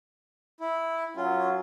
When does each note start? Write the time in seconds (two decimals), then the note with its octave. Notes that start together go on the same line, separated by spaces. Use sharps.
0.60 E4
1.16 F#2 F#3 C#4 F4